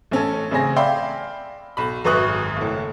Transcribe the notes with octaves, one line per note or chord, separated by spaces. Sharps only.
A1 C#4 A4
A1 C#3 C4 G#4 A#6
D5 E5 F5 G5 B5 C6
B1 B5
G#1 F#2 B4 C#6 D#6 F#6
F#1 A2